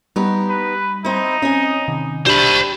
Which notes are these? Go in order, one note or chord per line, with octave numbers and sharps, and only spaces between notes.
G3 B3 D#4 G4
B4
C4 D#4 E4
C4 C#4 D#5 G#5
C3 D#3
G3 A3 D4 G4 C5 B5